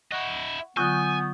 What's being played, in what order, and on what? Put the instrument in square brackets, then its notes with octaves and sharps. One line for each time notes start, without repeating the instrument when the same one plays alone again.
[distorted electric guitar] E4 D#5 [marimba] F#5 C#6 F#6
[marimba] D3 F#3 F4 [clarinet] B3 [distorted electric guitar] G#5 [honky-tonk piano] C#6 D#6 G6